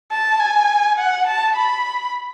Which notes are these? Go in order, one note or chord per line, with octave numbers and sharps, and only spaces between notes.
A5
G#5
F#5
A5
B5